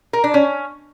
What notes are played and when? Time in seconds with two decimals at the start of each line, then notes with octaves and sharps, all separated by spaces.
0.13 A#4
0.24 D4
0.34 C#4